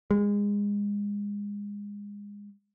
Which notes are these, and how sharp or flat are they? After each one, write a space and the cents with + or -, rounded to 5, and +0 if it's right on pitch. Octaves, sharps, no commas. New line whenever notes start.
G#3 -25